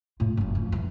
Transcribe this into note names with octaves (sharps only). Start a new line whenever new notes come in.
A2 F4
F#1 F#2
F2
E3 F3